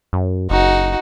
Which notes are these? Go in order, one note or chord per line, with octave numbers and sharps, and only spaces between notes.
F#2
F#1 D#4 F#4